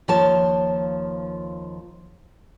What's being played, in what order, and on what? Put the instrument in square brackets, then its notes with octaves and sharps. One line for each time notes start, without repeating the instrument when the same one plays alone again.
[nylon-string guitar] D#2 F3 F4 C#5 A5